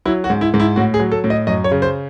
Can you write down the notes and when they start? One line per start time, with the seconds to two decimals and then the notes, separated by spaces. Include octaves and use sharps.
0.05 F#3 E4
0.24 F#4
0.30 G#2
0.41 E4
0.54 G#2
0.60 E4
0.76 A2 F#4
0.94 G#4
1.00 F#3
1.12 A4
1.24 A2
1.30 D#5
1.47 F#2 D#5
1.64 C#5
1.71 C#3
1.82 C5